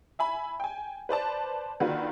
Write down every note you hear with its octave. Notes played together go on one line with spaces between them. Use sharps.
E5 G#5 B5
G5 G#5
B4 C5 D5 A5
D3 D#3 A#3 F4 F#4 B4